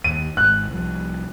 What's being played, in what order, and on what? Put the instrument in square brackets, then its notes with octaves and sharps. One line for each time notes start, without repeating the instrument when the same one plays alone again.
[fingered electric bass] D#2 [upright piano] D#7
[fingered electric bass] G#1 G#2 [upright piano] F#6
[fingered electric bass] C2 F3